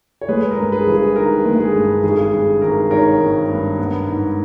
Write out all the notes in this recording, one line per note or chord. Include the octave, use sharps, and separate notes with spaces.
C#5
G#3 G#4 B4
A#4
G2
G#4 B4
G1
G#4
D#3 A#4
G#3
G#4
G2
G#1 G#4
G2 G#4
G#1 A#4
D#3 A#4 C#5
G#1
G2
B3
G#2